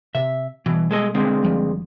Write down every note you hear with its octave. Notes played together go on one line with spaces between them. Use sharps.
C3 E5
B2 E3 G3
G#3 A4 D#5
D3 G#3 C4
F#1 F3 G3